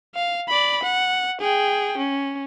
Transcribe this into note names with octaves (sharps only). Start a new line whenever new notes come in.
F5
D5 B5
F#5
G#4 G5
C#4